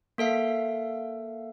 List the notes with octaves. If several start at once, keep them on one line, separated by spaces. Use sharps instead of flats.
A#3 A4 E5 F5